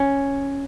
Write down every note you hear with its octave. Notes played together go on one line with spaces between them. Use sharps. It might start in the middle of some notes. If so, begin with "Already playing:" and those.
Already playing: C#4